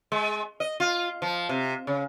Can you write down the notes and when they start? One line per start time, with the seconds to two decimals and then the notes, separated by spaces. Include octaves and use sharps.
0.12 G#3
0.60 D#5
0.80 F4
1.22 F3
1.49 C3
1.87 C#3